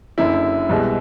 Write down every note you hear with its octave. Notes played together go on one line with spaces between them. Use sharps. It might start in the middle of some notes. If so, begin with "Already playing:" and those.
F#1 F#2 D3 E4
C2 B2 G#3